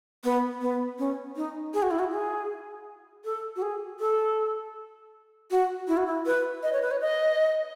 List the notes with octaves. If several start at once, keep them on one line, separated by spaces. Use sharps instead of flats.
B3
B3
C#4
D#4
G#4
F#4
E4
F#4
G#4
A4
F#4
G#4
A4
F#4
E4
F#4
E4
B4
D#5
C#5
B4
C#5
D#5